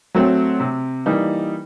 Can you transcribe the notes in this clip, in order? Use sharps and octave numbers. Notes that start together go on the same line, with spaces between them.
F#3 A3 C4
C3
E3 G3 A#3 D#4